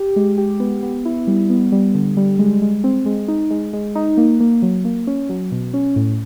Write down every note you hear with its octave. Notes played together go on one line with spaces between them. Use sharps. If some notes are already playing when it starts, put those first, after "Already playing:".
Already playing: G4
G#3
G4
B3
B3
E4
G3
B3
G3
D3
G3
G#3
G#3
C4
G#3
D#4
G#3
G#3
D#4
A#3
A#3
F#3
A#3
C#4
F#3
B2
C#4
A2